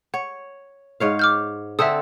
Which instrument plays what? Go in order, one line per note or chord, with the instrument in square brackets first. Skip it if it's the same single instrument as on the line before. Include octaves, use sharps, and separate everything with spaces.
[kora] C#5 [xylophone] F#5
[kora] G#2 C#5 F5
[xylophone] D6 F6 G6
[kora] D3 C4 A4 [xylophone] E5 A5 D#6